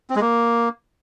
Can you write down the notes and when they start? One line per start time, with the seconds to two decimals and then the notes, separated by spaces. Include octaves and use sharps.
0.10 C4
0.16 G#3
0.21 A#3